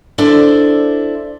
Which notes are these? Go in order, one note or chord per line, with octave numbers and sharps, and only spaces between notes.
D4 E4 A4 C5 D5 E5